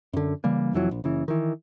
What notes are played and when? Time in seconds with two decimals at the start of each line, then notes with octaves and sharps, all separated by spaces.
0.13 F#2 D3
0.44 C#3 E3 G3 A#3
0.73 F1 F2 E3 F#3
0.91 A#1
1.04 F#1 C#3 E3
1.28 D#3 E3